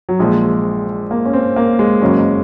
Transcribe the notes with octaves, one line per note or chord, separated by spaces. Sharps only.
F#3
A#1 A#2 F3 G#3
A#3
C#4
C4
A#3
G#3
F#1 F#2 C#3 F#3 C#4